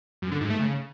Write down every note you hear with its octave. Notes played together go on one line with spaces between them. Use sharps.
F#2
D3
G#2
A3
C#3